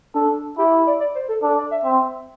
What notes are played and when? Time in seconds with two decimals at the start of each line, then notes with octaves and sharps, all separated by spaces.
0.15 D4 A4
0.58 E4 G4
0.87 D5
1.00 D5
1.15 C5
1.28 A4
1.42 D4 A4
1.58 D5
1.71 E5
1.85 C4